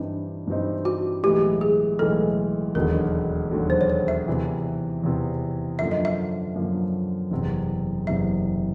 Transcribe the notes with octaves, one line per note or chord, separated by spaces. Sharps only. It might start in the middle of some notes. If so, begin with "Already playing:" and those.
Already playing: G2 E3 G3 C4 D4 D#4
G2 E3 G3 C4 D#4
F#4
B1 A2 E3 G#3 G4
G#4
B1 A2 E3 G#3 A4
E1 D#2 D3 F#3 A#4
E1 D#2 D3 F#3
C5
C#5
C5
E5
E2 C3 E3
E2 C3 E3
F#2 D3 F3 A#3 E5
D#5
E5
F#2 D3 F3 A#3
F#1 E2 C3
F#1 E2 C3 E5